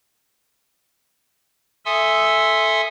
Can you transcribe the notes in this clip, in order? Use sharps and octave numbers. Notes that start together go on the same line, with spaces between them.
A4 E5 G#5 C6 D#6 E6